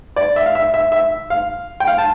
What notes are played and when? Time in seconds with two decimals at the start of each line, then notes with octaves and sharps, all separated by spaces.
0.16 D5
0.36 E5
0.46 F5
0.55 E5
0.74 E5
0.92 E5
1.30 F5
1.80 G5
1.87 F5
1.98 A5